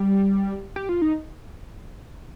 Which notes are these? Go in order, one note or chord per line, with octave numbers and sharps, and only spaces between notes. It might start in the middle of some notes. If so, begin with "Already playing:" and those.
Already playing: G3
G4
F4
D#4